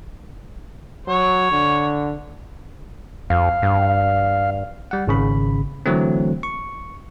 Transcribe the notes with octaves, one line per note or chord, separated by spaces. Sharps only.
F#3 C#5
D3
F2 F5
G2
G3 F#5
G#1 C#3 B5
D3 E3 F#3 A3 C4
C#6